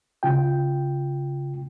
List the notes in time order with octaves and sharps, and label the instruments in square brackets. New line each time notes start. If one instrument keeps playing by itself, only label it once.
[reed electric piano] C#3 F4 G5